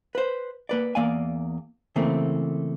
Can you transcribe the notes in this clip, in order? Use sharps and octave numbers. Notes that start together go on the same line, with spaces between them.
B4 C5
A#3 B4 D5
E2 A#3 D5 F5 G#5
C#3 E3 A3 A#3 C4